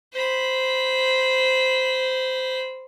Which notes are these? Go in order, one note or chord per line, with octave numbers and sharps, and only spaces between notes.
C5 B5